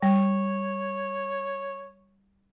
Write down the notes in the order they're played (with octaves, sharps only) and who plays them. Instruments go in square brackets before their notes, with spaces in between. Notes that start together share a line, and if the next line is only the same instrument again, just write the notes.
[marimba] G3 [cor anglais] C#5